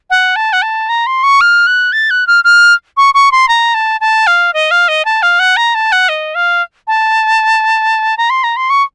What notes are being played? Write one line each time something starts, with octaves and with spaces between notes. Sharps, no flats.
F#5
A5
F#5
A5
A#5
C6
C#6
F6
F#6
A6
F#6
F6
F6
C#6
C#6
C6
A#5
A5
A5
F5
D#5
F5
D#5
A5
F5
F#5
A#5
A5
F#5
D#5
F5
A5
A#5
C6
A#5
C6
C#6